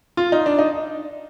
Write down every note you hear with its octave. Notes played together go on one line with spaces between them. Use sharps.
F4
D#4
D4
D#4